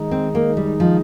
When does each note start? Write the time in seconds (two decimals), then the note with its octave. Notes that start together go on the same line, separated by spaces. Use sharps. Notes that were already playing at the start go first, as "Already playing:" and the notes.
Already playing: D#3 G#3 D#4
0.11 C4
0.35 A#3
0.57 G3
0.80 F3